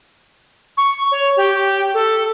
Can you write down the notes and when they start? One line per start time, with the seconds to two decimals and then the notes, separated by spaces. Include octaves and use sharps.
0.77 C#6
1.12 C#5
1.37 G4
1.94 A4